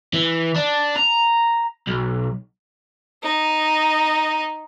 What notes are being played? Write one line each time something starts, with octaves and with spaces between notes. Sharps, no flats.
E3
D4
A#5
B1
D#4